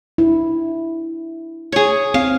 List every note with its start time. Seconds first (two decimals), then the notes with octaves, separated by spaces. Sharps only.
0.18 D4 E4
1.72 G#4 C#5
2.14 C4 F5